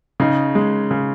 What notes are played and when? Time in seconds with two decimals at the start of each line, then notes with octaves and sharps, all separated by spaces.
0.20 C#3 D#4
0.55 G#3
0.91 C#3